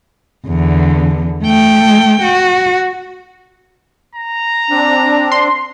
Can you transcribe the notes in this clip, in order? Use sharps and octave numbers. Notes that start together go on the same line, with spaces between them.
E2 D3
A3 G5
F#4
A#5
C4 D4
C6